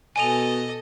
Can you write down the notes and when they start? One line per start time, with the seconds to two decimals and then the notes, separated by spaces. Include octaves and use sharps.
0.16 B2 A4 D#5 G#5 D#7 F7